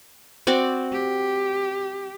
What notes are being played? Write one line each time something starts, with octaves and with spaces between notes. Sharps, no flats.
C4 F#4 D5
G4